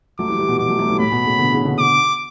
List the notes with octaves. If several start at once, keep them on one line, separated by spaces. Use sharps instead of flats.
F#3 A3 D6
E3 G3
E3 G3
B2
B2 D6
F#3 A3
F#3 A3
E3 G3
A2 B5
B2
A2 C#3
B2 D3
C#3 E3
B2 D3
D6